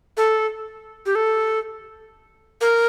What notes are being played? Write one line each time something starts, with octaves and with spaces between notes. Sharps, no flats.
A4
G4
A4
A#4